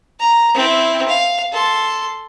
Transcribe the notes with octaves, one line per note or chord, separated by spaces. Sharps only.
A#5
C4 E4
F5
A4 C6